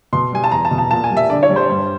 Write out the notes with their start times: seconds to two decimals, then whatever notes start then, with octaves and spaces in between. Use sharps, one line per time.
0.13 B2 C6
0.32 G3 G#5
0.44 A5
0.52 E2 A#5
0.65 A5
0.71 B2
0.78 A5
0.91 A#2 A5
1.04 G#5
1.10 G3
1.17 E5
1.30 D3 D5
1.43 C#5
1.50 G3
1.56 C5
1.70 G2